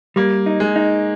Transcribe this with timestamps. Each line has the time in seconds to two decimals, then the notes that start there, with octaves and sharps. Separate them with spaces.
0.16 G3 A#3
0.46 D#4
0.60 G#3
0.76 D#4